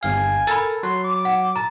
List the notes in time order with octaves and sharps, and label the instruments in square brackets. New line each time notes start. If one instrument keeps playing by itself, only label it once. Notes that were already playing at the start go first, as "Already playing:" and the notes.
[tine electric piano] G1 F5 [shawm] G#5
[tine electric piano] A4 A#4 [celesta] B5 A6
[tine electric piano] F#3 [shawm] C6
[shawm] D6
[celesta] F#5
[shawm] A5 [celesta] A#5